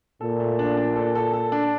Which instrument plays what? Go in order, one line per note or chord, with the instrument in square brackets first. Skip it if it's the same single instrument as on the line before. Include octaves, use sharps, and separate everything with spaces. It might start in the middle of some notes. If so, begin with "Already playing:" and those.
[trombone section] A#2 [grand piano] A4
[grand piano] A3
D4
D4
A4
A4
A4
D4